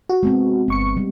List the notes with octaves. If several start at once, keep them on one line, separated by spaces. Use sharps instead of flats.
F#4
G#3 B3 C4
G1 B3 C#6 C#7
G3